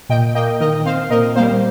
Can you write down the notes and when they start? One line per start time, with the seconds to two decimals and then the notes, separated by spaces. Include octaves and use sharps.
0.09 A#2 D#5 G5
0.35 A#3 D#5 G5
0.60 D#3 A#4 D#5
0.85 C4 C5 F5
1.10 A#2 A#4 D#5
1.36 G3 A#3 C5 F5